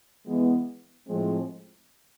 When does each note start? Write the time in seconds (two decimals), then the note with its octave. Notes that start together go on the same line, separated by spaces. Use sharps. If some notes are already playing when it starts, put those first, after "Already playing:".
0.25 E3 G#3 B3
1.07 A2 F3 G#3 C4